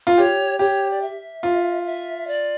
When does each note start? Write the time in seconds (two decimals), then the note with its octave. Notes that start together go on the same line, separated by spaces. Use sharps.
0.07 F4
0.18 G4 C#5
0.59 G4 C#5
0.91 D5
1.02 E5
1.43 F4
1.85 E5
2.27 D5